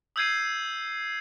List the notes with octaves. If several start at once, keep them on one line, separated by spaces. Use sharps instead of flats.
D#6 E6 G6 G#6 C7 D#7